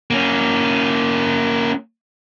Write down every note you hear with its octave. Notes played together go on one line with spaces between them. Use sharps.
A#3 C#4